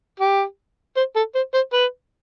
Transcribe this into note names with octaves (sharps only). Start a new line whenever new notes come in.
G4
C5
A4
C5
C5
B4